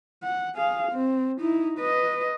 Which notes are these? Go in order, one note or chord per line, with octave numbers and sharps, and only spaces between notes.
F#5
G#4 F5
C4
D#4 E4
B4 D#5